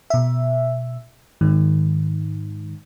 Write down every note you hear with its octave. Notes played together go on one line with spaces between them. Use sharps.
B2 E5
G#2 D#3